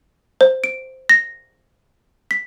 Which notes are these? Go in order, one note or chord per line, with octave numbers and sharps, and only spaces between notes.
C5
D7
A#6
B6